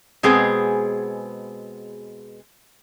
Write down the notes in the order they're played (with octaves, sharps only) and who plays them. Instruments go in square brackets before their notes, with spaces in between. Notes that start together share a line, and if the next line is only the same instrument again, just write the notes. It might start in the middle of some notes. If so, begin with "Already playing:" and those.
[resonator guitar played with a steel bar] B2 G#3 B3 C4 G#4